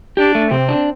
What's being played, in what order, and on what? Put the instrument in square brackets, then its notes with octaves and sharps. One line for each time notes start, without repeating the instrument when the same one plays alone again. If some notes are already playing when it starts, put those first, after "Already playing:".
[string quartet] D4 [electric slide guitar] G4
[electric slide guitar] A3
[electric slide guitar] C3 [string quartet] C4
[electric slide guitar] D4